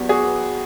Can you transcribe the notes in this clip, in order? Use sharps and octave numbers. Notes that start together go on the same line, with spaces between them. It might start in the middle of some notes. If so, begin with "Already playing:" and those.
Already playing: E2 F#3 G4
F#4 G#4
B3